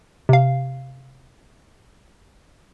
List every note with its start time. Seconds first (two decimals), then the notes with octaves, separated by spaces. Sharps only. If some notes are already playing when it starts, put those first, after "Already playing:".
0.29 C3 F5